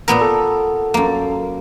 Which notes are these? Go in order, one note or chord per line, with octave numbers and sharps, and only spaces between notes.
A#2 B3 A#4
A4
F#2 A#3